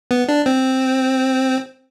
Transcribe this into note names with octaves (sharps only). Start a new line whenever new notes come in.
B3
D4
C4